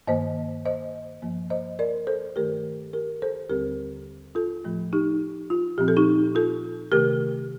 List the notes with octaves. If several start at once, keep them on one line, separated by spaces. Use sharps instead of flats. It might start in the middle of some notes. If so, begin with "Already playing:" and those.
G2 D#3 A#3 C5 D#5
C5 D#5
G2 F3 A#3
C5 D#5
A#4 D5
A4 C5
G2 D#3 A3 G4 A#4
G4 A#4
A4 C5
D#2 D3 G3 C4 G4 A#4
F4 A4
A2 F3 A3
D#4 G4
F4
A#2 F3 C4 G4
A4
D#4 G4
F4 A4
C3 D#3 A3 G4 A#4